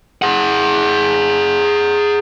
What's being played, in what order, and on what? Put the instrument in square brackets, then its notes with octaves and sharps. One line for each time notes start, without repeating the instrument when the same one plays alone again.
[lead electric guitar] G#4 F#5